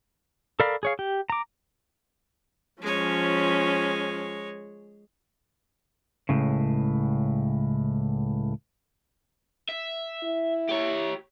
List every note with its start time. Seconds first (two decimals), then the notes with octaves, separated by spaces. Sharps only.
0.60 A4 A#4 D5 F5 B5
0.83 G#4 C#5 F5
0.99 G4
1.30 A#5 D6
2.82 F3 G#3 C#4 C#5
6.29 C#2 A2 C#3
9.69 E5
10.23 E4
10.69 G4 C#5